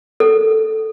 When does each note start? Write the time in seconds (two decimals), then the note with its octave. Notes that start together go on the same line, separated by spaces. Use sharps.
0.20 A4